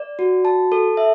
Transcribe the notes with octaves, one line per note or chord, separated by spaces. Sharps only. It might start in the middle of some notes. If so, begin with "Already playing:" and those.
Already playing: D5
F#4
A5
A4
E5